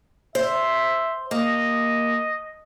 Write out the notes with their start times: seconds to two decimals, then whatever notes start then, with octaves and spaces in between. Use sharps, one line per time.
0.35 C5 E5
1.31 A#3 D#5